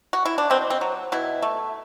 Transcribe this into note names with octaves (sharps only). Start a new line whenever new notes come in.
F#4
E4
D4
B2 C4
C4
F#3
B2 E4
A3